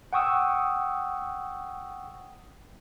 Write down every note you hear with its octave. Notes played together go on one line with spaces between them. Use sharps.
F#5 G5 C#6 D#6 E6